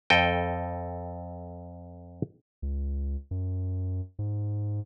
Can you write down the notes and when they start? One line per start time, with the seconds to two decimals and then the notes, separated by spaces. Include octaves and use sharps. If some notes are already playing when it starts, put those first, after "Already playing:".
0.10 F2 A4 D#5 G5
2.62 C#2
3.31 F#2
4.19 G#2